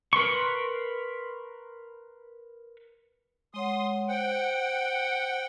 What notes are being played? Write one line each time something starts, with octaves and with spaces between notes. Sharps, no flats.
A#4 B4 C6 C#6
G#3 C#5 F#5 C6 D#6
C5 F#5 G5